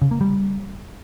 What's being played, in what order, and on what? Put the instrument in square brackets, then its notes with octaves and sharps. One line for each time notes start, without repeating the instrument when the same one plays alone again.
[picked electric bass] C#3
A#3
G3